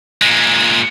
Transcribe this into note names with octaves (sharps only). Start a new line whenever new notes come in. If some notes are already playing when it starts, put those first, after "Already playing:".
A#2 G#3